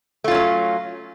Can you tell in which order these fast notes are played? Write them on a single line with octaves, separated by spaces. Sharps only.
A3 F4 C#4 F#3